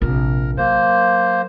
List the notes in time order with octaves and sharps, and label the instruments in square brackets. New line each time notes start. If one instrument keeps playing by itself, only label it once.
[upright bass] A#1 C3 [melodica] A#4
[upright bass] F#3 [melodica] A#3 C5